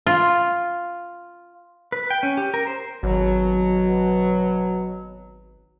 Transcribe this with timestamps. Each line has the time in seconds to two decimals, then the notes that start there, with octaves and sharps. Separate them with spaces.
0.06 F4
1.92 B4
2.10 G5
2.23 C#4
2.37 G4
2.54 A#4
2.67 C5
3.03 G#1 B2 F#3